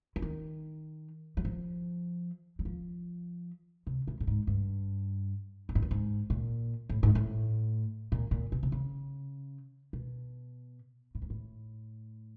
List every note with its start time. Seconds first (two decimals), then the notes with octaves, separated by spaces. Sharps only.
0.16 E3
0.22 D#3
1.37 F#3
1.45 F3
2.59 F#3
2.65 F3
3.87 C3
4.07 A2
4.21 A2
4.27 G#2
4.47 G2
5.69 A2
5.75 G#2
5.82 G2
5.91 G#2
6.30 A#2
6.89 A2
7.03 G#2
7.15 A2
8.12 A#2
8.31 A#2
8.52 B2
8.63 C3
8.72 C#3
9.93 B2
11.15 A2
11.22 G#2
11.30 A2